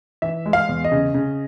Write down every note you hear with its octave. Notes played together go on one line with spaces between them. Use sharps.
E3 E5
G#3
F5
E2
D#5
C#3
C#3